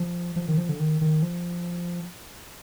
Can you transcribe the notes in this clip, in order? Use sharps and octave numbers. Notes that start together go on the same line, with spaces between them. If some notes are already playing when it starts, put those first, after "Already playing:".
Already playing: F3
F3
D#3
F3
D3
D#3
D#3
F3